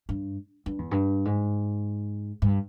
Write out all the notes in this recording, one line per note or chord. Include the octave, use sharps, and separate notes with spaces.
G2
G2
E2
G2
G#2
G2